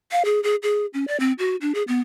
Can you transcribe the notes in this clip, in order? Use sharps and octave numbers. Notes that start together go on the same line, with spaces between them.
F5
G#4
G#4
G#4
C#4
D5
C4
F#4
D4
G#4
B3